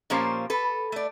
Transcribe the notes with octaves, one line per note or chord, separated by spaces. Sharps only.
A#2 F3 A#3 C#4 G4 C5
A4 B4
A3 D5